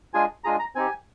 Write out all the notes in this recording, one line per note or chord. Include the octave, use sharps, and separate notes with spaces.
G#3 D4 F4 G#4 G#5
G#3 D4 F4 G#4 A#5
A#5
C4 D#4 G4 G#5